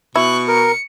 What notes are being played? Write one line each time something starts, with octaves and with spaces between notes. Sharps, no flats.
B2 E4 C#6 F#6
A#4 C#7